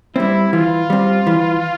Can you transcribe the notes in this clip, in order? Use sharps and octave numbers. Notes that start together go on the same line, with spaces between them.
G3 C4 E4
E3 F4
G3 C4
E3